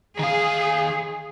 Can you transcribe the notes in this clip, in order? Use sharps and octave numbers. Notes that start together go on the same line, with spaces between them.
D#3 G#4 F5